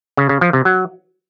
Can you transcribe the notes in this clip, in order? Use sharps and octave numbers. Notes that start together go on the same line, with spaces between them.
C#3
C#3
F3
C3
F#3